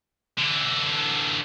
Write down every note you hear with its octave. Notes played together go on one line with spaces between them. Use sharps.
D3 E3